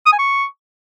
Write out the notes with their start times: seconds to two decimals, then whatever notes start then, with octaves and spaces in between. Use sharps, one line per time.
0.06 D#6
0.12 G#5
0.19 C#6